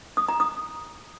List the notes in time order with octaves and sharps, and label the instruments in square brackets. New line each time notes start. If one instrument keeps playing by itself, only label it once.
[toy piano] D#6
A#5
D#6